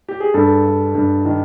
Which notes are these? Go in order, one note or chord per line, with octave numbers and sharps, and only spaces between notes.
G4
G#4
G2 A4
G2
G2
D#3